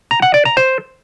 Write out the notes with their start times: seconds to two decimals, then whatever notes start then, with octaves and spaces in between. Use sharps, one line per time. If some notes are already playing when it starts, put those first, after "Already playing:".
0.11 A#5
0.22 F#5
0.34 D5
0.45 A#5
0.57 C5